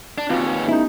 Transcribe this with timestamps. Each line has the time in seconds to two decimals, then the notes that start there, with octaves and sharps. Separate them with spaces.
0.18 D4
0.30 D#2 C4 C#4 F4 F5
0.47 B4
0.69 A3 B3 C#4 D#4 E4 G6